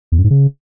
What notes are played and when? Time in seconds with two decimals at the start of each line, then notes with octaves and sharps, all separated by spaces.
0.12 E2
0.18 F#2
0.24 G#2
0.30 C#3